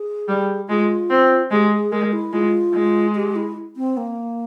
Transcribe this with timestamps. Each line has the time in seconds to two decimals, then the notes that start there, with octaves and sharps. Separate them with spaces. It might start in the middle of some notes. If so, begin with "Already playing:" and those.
Already playing: G#4
0.28 G3
0.69 G#3 F4
1.10 C4
1.51 G#3 G4
1.72 G#4
1.92 G#3 A#4
2.13 E4
2.33 G#3 F4
2.74 G#3
3.15 G4
3.36 E4
3.76 C4
3.97 A#3